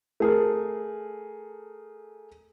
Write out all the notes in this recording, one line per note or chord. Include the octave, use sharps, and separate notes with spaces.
A3 G#4 A#4